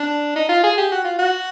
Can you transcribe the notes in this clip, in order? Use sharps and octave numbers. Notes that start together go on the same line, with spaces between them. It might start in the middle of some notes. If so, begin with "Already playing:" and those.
Already playing: D4
D#4
F4
G#4
G4
F#4
F4
F#4